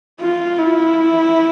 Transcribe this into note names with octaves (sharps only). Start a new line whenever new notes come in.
F4
E4